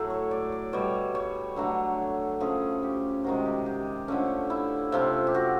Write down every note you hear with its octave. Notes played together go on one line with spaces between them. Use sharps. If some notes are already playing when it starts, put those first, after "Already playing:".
Already playing: A2 F#3 A3
C#5
D5
D5
B2 G3 C#5
C#5
D3 F#3 A3
C#3 F3 A3 G#4
G4
C3 D#3 G#3 F#4
G4
G4
D3 F3 A3 C#4
E4
C3 F3 A3 F4
G4
F#4